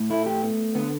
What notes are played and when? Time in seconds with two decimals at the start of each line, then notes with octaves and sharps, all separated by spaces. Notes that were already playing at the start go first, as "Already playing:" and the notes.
Already playing: A2
0.10 A3 E4
0.26 G4
0.42 B3
0.75 D3 B3